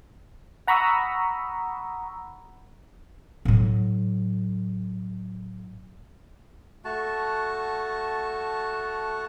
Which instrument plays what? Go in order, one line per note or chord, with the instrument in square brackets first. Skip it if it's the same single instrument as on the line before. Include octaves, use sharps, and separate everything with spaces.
[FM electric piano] F#5 A#5 B5 C#6 D#6 E6
[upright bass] A2 F#3
[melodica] A3 F#4 A5